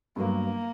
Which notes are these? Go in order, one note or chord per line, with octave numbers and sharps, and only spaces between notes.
G2 F#3 A#3 B3